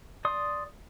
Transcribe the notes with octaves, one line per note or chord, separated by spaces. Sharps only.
D5 C6 D#6